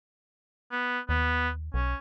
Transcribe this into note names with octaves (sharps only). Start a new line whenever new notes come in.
B3
D#2 B3
B1 C#4